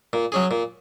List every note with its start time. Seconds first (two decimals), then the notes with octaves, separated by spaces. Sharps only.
0.13 A#2
0.32 F#3 C#4 G#4
0.51 A#2